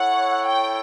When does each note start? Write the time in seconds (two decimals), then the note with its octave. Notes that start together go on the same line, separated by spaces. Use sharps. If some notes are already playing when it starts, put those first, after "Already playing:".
Already playing: E4 A4 C#5 F#5
0.47 G5